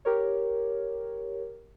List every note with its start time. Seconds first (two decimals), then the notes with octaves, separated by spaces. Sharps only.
0.05 G4 A#4 C#5